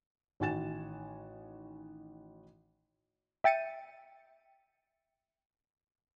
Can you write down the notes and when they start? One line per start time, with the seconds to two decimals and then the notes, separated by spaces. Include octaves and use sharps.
0.40 A1 D#3 F#4 G#5 A6 E7
3.44 E5 G5 A6 C#7 D#7